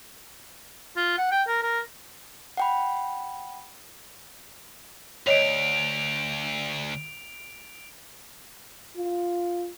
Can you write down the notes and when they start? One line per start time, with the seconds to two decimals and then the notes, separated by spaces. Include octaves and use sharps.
0.96 F4
1.18 F#5
1.31 G5
1.48 A#4
1.63 A#4
2.57 F#5 G5 B5
5.27 D2 C#5 D#5 D7 F7
8.97 F4